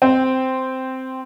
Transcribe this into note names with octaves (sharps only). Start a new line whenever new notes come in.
C4